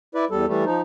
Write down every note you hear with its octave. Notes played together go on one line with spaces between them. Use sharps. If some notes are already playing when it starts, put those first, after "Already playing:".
E4 B4 D5
E2 G3 A4
E3 G3 A3
F3 D#4